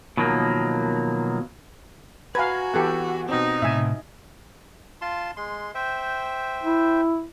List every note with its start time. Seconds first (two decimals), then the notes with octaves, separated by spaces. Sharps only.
0.17 B2 D#3 F3 F#3 A#3
2.35 F#4 B4 F5 G#5 A#5 G#6
2.74 E3 B3 G4 A4 F#5
3.29 B2 C4 D#4
3.62 A2 C3 E5 G#5
5.01 F4 A5 C6
5.37 G#3 C6
5.75 C5 E5 G5
6.63 E4